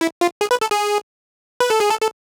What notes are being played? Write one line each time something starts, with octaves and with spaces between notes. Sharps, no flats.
E4
F4
G#4
B4
A4
G#4
B4
A4
G#4
A4
A4